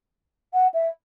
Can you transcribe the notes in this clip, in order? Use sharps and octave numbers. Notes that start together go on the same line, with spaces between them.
F#5
E5